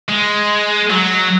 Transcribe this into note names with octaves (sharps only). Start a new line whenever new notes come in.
G#3
F#3